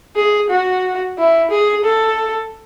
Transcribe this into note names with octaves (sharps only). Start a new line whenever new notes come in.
G#4
F#4
E4
G#4
A4